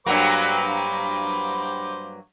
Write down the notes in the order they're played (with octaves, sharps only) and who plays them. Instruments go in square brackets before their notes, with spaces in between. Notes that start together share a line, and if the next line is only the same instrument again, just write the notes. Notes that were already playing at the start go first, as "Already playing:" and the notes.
[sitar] G2 F#3 A#3 [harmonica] C5 B5 D6